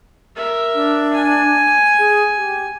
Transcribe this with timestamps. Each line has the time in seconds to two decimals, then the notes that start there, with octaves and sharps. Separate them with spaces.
0.36 A#4 E5
0.74 D4
1.13 G#5
1.98 G#4
2.37 G4